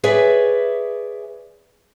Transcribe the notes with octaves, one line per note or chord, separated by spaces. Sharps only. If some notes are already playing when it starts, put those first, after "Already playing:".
G#4 B4 C#5 D5 E5 G#5